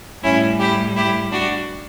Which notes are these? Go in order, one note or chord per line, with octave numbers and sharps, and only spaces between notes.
A2 G3 C#4 E4
E4 G4
E4 G4
D4 F#4